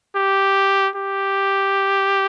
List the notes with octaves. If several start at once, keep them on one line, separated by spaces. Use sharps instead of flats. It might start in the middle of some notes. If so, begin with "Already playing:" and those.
G4
G4